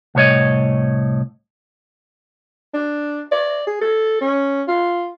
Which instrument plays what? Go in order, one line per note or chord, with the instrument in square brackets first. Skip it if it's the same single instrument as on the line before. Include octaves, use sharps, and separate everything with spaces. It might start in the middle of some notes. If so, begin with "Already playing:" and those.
[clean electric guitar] C2 A2 C#5 D#5
[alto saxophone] D4
D5
G#4
A4
C#4
F4